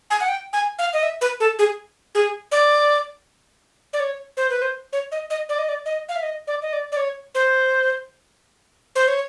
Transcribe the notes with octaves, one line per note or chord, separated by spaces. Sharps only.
G#5
F#5
G5
G#5
F5
D#5
E5
B4
A4
G#4
G#4
D5
D5
C#5
C5
B4
C5
C#5
D#5
D#5
D5
D#5
D5
D#5
F5
E5
D#5
D5
D#5
D5
D5
C#5
C5
C5
C#5